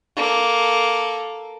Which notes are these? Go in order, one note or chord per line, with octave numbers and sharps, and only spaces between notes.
A#3 A4